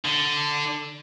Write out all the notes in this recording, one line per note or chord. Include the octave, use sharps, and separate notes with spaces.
D3